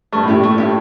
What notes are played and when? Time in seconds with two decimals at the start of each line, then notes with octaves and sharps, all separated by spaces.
0.12 G2 A3
0.23 A2
0.28 A#2 E4 G4
0.43 A3
0.58 E4 G4